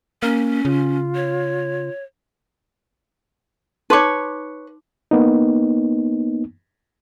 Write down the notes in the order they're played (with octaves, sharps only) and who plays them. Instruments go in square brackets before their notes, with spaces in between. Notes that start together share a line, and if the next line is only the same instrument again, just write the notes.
[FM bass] A#3 [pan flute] C#4
[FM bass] C#3 [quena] F4
[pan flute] C#5
[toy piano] D#4 C6 D6 [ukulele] B4 C#5
[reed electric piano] A#3 B3 D#4